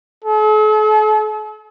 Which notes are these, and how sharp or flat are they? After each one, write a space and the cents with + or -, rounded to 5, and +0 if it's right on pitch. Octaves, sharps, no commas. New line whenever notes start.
A4 -45